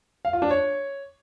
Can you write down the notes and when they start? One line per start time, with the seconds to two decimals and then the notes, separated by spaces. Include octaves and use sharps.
0.25 F5
0.33 F4
0.42 D4
0.51 C#5